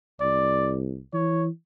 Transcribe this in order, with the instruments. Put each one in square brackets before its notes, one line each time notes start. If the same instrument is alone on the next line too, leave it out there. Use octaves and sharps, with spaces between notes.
[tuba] C2 [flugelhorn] D5
[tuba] E3 [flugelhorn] C#5